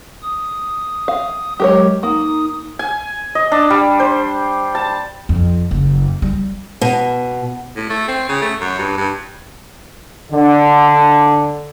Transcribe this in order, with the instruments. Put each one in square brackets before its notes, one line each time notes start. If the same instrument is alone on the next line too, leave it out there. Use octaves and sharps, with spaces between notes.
[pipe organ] D#6
[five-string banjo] F5
[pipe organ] F#3 G#3 [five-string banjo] G4 A#4 C#5
[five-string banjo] A#3 [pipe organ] D#4 D#6
[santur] G#5
D#5
D4
G3
C5
A5
[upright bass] F2
F#1
G3
[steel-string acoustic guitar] B2
[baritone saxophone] A2
A3
C4
C#3
A3
F#2
G2
G2
[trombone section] D3